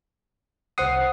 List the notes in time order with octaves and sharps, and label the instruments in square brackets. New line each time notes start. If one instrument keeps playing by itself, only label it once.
[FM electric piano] C2 C5 C7 [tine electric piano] F#5 D#6